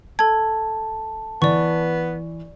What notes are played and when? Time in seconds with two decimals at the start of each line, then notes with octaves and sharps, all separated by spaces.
0.19 A4 A5 G#6
1.42 E3 B3 D5 C#6